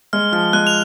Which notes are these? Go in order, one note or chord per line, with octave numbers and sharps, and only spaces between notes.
G#3 F6
F3 F6
G#3 F#6
F7